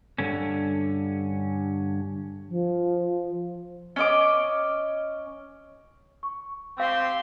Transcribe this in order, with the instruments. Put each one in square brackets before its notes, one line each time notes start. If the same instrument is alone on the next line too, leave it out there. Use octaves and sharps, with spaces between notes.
[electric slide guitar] G2 D3 C#4
[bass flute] F3
[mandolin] C#4 D#5 D6
[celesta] C#6
[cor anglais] C4 [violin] G4 C6 [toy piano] F5 E6